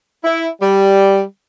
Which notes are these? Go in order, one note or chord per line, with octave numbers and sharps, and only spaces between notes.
E4
G3